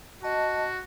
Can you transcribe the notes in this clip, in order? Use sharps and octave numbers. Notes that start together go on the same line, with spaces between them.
F#4 D#5 A5